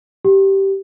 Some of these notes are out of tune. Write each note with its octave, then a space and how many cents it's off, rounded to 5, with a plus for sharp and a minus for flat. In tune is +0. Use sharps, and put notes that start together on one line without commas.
G4 -10